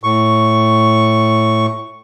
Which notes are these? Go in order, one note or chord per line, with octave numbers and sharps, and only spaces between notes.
A2 C#6